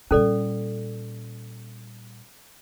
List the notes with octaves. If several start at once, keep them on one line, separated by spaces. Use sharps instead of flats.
A#2 G3 C#4 A4 D5